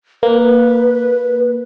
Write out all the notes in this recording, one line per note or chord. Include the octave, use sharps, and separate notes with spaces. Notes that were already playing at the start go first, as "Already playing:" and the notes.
A#3 B4